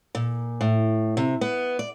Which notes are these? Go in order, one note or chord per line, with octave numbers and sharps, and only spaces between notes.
A#2
A2
C3
B3
D5